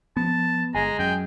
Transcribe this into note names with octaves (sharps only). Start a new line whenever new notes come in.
F3 B3 A5
G1 G#3 G#5 A#5
F#2 G5